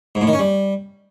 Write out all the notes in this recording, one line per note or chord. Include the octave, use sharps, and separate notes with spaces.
G#2
A2
D#3
C#4
G3